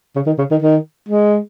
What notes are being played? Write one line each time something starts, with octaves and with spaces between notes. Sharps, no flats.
C#3
D#3
C#3
D#3
D#3
G#3